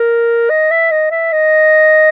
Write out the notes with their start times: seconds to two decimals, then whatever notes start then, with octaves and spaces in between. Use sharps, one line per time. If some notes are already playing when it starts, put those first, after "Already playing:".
Already playing: A#4
0.50 D#5
0.71 E5
0.91 D#5
1.11 E5
1.33 D#5